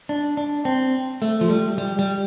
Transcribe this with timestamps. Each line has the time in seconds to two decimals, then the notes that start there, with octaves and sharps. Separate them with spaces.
0.09 D4
0.37 D4
0.65 C4
1.22 A3
1.41 F3
1.50 G3
1.78 G3
1.99 G3